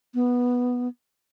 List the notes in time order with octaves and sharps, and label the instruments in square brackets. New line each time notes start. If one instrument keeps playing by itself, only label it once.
[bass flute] B3